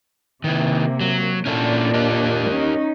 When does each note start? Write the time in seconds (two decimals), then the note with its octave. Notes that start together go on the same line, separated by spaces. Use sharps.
0.44 C3 D#3 A#3 E4
1.01 F#3
1.45 A#2 C#4 D4 E4 A4
1.94 G4 A#4 D#5
2.50 C#4 D#4